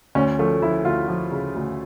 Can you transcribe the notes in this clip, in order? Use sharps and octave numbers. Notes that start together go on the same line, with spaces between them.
D2 C#4
F3 A3
F3 E4
D2 F4
F3
C#3
D2